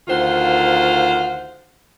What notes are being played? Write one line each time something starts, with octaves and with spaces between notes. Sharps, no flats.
D2 D#3 F4 C5 F5 F#5